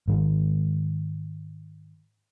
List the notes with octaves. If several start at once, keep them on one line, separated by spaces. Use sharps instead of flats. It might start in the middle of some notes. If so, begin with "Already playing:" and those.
G#2 D#3 G#3